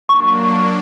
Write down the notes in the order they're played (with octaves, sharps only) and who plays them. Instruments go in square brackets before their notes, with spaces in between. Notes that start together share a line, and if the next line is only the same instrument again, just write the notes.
[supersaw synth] F#3 A#3 D4 [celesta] C#6